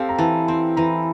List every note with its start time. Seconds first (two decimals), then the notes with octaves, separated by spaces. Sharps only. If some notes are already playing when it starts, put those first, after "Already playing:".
Already playing: C4 G4 A4 F5
0.09 A#5
0.18 E3 A5
0.48 C4 C6
0.77 E3 A#5